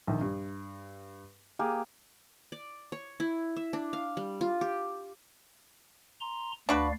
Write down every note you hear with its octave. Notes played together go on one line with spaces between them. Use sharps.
A#1 D#3
G2
A#3 G4 G#4
D5
C#5
E4
E5
D4
F5
G3
F4
G4
A#5 C6
D2 D4 F#4 B4 D5 F5